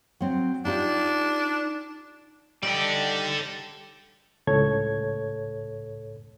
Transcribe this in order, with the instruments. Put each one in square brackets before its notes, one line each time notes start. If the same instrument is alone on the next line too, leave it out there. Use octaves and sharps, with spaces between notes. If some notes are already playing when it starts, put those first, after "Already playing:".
[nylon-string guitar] F#3 C4
[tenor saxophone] D4 [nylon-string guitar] D#4 F4 G4
[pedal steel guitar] G3 D#4 G4 [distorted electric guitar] A4 D5
[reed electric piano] C#2 A2 A4 C#5 G#6